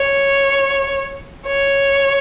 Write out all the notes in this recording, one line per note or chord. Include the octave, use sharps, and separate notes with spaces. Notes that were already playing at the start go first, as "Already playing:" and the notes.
Already playing: C#5
C#5